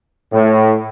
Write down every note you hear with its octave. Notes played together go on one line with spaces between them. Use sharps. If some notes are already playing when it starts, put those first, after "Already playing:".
A2